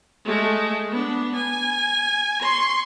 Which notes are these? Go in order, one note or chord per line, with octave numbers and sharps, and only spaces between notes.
G#3 A3
B3 D4
G#5
C6 C#6